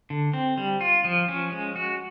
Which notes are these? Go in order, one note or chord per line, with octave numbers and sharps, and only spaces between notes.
D3
C4
G3
F4
F3
C#4
G#3
F#4